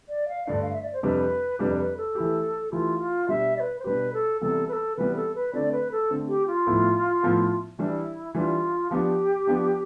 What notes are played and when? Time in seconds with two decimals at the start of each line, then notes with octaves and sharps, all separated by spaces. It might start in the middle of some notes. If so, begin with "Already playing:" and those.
0.09 D5
0.28 F5
0.47 G2 D3 A3 D5
0.62 F5
0.73 E5
0.82 D5
0.93 C5
1.03 F2 C3 G3 D4 G4 B4
1.59 F2 C3 G3 D4 G4 B4
1.78 B4
1.97 A4
2.15 E3 A3 E4 G4
2.71 E3 A3 E4 F4 G4
2.99 F4
3.28 B2 G3 D4 G4 E5
3.57 D5
3.60 B4
3.79 C5
3.84 B2 G3 D4 G4 B4
4.13 A4
4.41 C3 E3 G3 B3 A4
4.68 B4
4.73 A4
4.97 C3 E3 G3 B3 B4
5.16 A4
5.35 B4
5.53 D3 A3 C4 D5
5.72 B4
5.92 A4
6.10 D3 A3 C4
6.28 G4
6.47 F4
6.67 A2 F3 B3 E4
7.23 A2 F3 B3 E4
7.78 E3 G3 D4 E4
8.34 E3 G3 D4 F4
8.91 F3 B3 D4 G4
9.47 F3 B3 D4